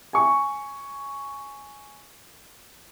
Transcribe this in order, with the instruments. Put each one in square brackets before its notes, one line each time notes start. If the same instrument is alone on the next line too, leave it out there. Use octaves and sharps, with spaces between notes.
[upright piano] G#5 C#6